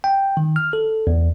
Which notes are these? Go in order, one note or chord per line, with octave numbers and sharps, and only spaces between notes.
G5
D#3
F6
A4
E2